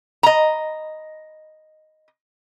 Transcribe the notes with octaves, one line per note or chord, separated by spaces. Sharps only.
D#5 A#5